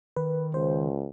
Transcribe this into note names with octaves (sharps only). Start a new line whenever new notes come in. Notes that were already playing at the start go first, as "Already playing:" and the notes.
D#3 B4
C#2 C5